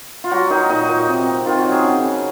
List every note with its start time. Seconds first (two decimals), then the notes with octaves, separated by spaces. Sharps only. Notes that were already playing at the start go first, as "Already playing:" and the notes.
0.24 F4
0.31 F#3 F#4
0.50 D#3 D#4
0.69 A#2 D#4
0.89 A#2
1.08 C3
1.27 C4
1.46 D#3 F4
1.59 F#4
1.65 F#3
1.72 G#4
1.84 C#3
2.03 C#3